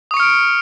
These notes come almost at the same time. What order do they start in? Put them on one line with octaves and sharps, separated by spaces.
D#6 C#6 C#7 F6 D7